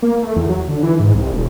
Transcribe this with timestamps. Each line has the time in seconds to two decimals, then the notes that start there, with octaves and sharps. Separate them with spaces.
0.02 A#3
0.23 A3
0.36 E2
0.49 F#3
0.67 D3
0.83 E3
1.00 G#2
1.14 C2
1.32 E1